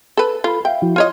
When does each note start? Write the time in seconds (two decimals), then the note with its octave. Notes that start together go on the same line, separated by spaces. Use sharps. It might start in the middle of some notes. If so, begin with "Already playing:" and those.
0.17 A4 B4
0.44 F4 A4 B5
0.65 E5 F5 G5
0.82 F3 E4 F#4
0.96 F4 C#5 D#5 C6